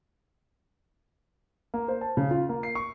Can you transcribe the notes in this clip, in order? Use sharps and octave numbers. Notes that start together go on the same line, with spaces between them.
A#3
C5
A5
C#3
F4
A#3
C7
C#6